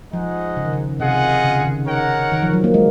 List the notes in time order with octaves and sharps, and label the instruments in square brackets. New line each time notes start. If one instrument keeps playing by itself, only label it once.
[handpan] F3 [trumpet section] G#3 D#4 G#4 D#5 F#5
[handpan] C#3
D#3
C#3
[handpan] C3 [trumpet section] F4 G#4 D#5 F#5
[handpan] C#3
C#3
D#3
[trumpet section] D#4 A#4 C#5 F#5
[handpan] D#3
F3
F#3
A#3
G#3